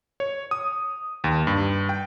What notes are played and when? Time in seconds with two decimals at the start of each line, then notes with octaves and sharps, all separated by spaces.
0.20 C#5
0.51 D#6
1.24 D#2
1.47 G2
1.89 G5